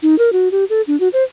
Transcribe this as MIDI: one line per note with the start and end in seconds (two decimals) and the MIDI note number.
0.03 0.18 63
0.19 0.32 70
0.33 0.48 66
0.52 0.65 67
0.70 0.82 69
0.87 0.98 62
1.00 1.08 66
1.13 1.23 72